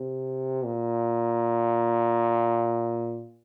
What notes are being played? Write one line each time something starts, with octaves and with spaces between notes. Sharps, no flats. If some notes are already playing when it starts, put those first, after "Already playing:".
Already playing: C3
A#2